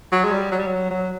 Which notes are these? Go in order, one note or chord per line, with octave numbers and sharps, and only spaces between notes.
F#3
G#3
G3
F#3
G3
F#3
F#3